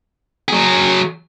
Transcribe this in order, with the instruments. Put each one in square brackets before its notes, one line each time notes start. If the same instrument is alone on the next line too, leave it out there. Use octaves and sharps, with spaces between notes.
[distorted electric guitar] F#3 G#4